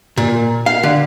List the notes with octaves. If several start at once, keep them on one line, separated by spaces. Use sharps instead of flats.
A#2
F5
D3